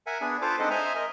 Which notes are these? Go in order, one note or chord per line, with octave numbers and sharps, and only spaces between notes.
A#4 E5 F#5 G#5
B3 D4 G#4
F4 A4 B4 C5 F5 D6
G#3 C4 D4 D#4 D#5 F#5
C5 D#5 E5 G#5 A#5
A#4 D#5